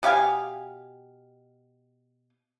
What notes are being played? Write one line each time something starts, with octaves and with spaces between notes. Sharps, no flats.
B2 G4 F5 G#5